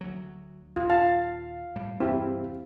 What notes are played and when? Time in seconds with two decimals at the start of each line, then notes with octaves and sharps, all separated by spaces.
0.01 D2 F#3
0.76 D#2 A#2 F4
0.90 F5 A5
1.76 A2 G3
2.00 E2 G2 C3 C4 E4 G4